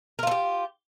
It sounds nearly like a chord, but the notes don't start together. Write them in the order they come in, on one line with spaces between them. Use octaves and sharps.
A#4 F4 A4 G4